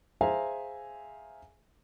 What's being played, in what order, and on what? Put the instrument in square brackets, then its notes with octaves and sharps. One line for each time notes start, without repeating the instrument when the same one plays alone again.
[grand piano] G#4 C5 E5 F5 G#5 A#5